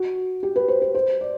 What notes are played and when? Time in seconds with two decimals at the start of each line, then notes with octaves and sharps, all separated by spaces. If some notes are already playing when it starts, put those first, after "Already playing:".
Already playing: F#4
0.43 G4
0.56 B4
0.68 C5
0.82 B4
0.95 C5
1.21 D5